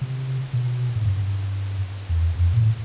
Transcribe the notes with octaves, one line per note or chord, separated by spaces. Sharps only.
C3
B2
G#2
G2
E2
F2
A#2
A2